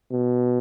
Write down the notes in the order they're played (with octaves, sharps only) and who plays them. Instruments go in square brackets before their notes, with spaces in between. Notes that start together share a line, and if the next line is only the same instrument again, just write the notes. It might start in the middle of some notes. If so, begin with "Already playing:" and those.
[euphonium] B2